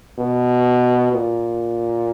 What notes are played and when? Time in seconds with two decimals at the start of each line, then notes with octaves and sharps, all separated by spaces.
0.19 B2
1.13 A#2